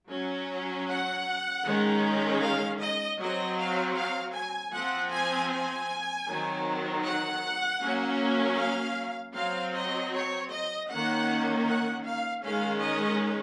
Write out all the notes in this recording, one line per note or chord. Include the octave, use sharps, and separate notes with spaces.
F#3 C#4
F#5
D#3 G#3 C#4
F5
D#5
F#3 C4 D#5
F5
F5
G#5
F3 C4 F#5
G#5
G#5
D#3 F#3 C4
F#5
F#3 A#3 C#4
F5
F#3 C4 F5
D#5
C#5
D#5
D#3 A#3 C#4 F#5
F#5
F5
D#3 G#3 C#4 F5
D#5